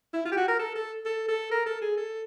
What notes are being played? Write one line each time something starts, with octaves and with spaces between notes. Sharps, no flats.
E4
F4
G4
F#4
A#4
A4
A4
A4
A4
A#4
A4
G#4
A4